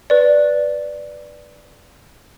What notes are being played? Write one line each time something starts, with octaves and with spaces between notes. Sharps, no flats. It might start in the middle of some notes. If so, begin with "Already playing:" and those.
B4 D5